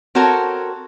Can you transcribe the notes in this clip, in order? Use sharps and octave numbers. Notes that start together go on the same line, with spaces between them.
C4 F#4 A4 A#4 C#5